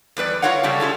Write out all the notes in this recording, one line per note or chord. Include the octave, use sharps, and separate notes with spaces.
E2 G3 B4 D5
E4 F4 A#4 C#5 F5 F#5
C#3 G3 A3 C#4 D4
C#4 F4 G#4 A4